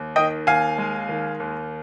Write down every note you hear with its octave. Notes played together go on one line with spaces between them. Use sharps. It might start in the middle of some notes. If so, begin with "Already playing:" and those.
Already playing: D#2
D#3 D#5 G5
D#2 F5 G#5
G#3
D#3
D#2